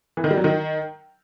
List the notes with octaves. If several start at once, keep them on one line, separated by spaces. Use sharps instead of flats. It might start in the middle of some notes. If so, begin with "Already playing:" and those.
E3
D#3
G3
F#3
D#3